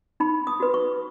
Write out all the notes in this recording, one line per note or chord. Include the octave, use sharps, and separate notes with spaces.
D#4 B5
D#6
F#4 B4
C#6